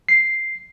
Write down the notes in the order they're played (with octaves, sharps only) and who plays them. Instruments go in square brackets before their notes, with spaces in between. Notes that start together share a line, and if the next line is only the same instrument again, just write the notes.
[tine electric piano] C7